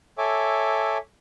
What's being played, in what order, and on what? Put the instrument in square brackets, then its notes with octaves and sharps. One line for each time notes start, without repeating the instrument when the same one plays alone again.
[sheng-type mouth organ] A4 C#5 E5 G#5 D6